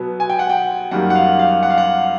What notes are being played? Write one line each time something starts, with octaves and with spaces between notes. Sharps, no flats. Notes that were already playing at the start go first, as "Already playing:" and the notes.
Already playing: B2 F#3 B3
G#5
G5
F#5
G5
F#2 D#3 G3 A#3 F#5
F#5
F5
F5
F#5
F5
F#5